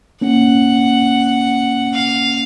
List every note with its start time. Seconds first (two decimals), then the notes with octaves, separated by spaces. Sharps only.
0.21 A#3 C#4 F#5
1.93 F5